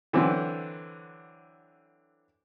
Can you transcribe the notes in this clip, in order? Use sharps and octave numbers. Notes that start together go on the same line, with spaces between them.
D3 E3 F#3 C4